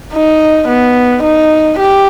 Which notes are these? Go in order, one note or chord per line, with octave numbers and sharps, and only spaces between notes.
D#4
B3
D#4
G4